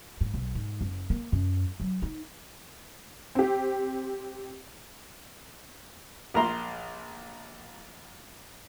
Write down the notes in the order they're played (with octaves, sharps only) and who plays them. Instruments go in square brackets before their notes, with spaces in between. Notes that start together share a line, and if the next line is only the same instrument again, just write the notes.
[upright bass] G#2
B1
G#2
F#1
A#3
F#2
F#3
D#4
[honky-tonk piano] C4 G4
[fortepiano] A#1 A#4 A#5 C6